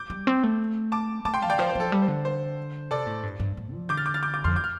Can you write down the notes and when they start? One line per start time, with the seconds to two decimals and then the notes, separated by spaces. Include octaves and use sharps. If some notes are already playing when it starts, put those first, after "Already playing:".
Already playing: D6 G6
0.10 G3
0.27 C4
0.43 A3
0.92 A5 D6
1.25 A3 A5 D6
1.34 G5 C6
1.42 F5 A5
1.50 D3 D5 G5
1.58 F3 C5 F5
1.69 C5
1.75 F3 A4
1.92 G3 A4
2.02 C5
2.08 D3
2.25 C5
2.91 C3 A4 D5
3.07 A2
3.23 G2
3.40 G2
3.57 A2
3.73 F3
3.89 D3 D6 G6
3.97 F6 A6
4.06 D6 G6
4.14 F6 A6
4.23 D6 G6
4.34 D6 G6
4.44 F2 C6 F6
4.56 D6 G6
4.64 F6